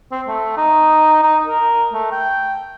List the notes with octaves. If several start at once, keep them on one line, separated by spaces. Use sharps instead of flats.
C4
A3
D#4
D#4
A#4
A3
G5